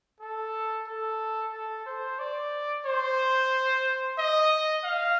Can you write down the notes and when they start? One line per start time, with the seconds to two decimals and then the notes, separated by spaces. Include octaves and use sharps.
0.21 A4
0.87 A4
1.53 A4
1.86 C5
2.19 D5
2.86 C5
4.18 D#5
4.84 F5